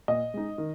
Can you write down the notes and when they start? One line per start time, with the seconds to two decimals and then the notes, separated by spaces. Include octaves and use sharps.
0.08 A#2 D#5
0.34 G#3 D#4
0.58 D#3